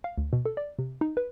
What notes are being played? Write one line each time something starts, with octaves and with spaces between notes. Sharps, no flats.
F5
D2
B2
A4
D5
C3
D#4
B4